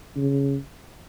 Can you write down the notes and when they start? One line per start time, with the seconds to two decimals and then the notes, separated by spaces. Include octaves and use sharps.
0.16 C#3